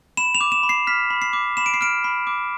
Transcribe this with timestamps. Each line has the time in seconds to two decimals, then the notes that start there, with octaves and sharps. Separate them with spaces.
0.17 B5 E7
0.35 F7
0.41 D6
0.52 E7
0.63 B5
0.69 C7
0.87 F6 B6
1.10 B5
1.22 C7
1.33 D6
1.57 B5 E7
1.66 D7
1.74 C7
1.81 F6 D7
2.04 B5
2.27 D6